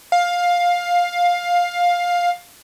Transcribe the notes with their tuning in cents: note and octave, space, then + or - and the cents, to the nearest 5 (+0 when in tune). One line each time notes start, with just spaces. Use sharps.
F5 +15